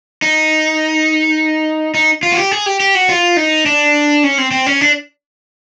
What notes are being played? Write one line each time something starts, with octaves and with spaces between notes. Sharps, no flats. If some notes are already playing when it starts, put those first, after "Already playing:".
D#4
D#4
F4
F#4
G4
G#4
G4
G4
F#4
F4
D#4
D4
C#4
C4
C4
C#4
D4